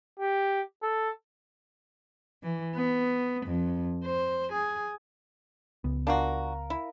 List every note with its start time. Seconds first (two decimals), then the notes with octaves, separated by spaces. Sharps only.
0.20 G4
0.83 A4
2.43 E3
2.76 B3
3.47 F2
4.04 C5
4.53 G#4
5.84 C#2 B3
6.07 D4 F4 F#4 A#4 F5
6.70 E4